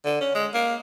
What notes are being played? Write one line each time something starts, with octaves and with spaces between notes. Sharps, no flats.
D3
C#4
G#3
A#3